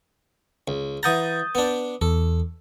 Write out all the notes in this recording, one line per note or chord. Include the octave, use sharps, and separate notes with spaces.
C#2
E3 F#5 A#5 D#6 G6 A6
B3 D4
E2 A4